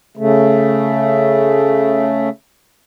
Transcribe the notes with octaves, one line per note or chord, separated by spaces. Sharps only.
C#3 A3